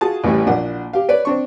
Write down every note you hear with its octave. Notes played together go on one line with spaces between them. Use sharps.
F4 F#4 G#4 A5
A1 A2 E3 G3
A#1 D4 F#5
G4 F5
B4 C#5 D5
C4 D4 C#6